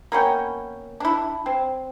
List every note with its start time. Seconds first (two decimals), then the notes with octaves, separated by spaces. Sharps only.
0.12 A#3 B3 C#4 G5
1.00 D4 E4
1.46 C4